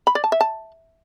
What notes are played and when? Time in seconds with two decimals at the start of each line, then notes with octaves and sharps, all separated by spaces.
0.07 B5
0.15 D5
0.24 A5
0.32 E5
0.41 A5